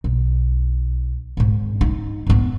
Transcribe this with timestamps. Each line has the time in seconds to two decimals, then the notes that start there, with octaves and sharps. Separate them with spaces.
0.04 B1
1.37 G#1 G#2
1.81 D#4
2.27 G#2 B3